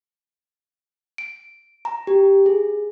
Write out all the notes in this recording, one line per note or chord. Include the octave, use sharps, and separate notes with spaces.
D7
A#5
G4
G#4